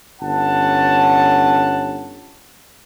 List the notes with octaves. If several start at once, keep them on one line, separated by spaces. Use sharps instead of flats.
G1 C#4 F#5 A5